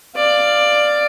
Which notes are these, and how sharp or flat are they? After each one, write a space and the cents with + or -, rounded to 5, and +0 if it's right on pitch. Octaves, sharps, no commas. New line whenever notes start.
D5 +10 F5 +0